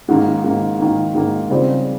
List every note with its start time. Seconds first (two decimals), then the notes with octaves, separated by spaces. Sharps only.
0.08 G#2 D#3 A#3
0.44 G#2 D#3 A#3
0.79 G#2 D#3 A#3
1.15 G#2 D#3 A#3
1.50 C#3 G3 C4 F4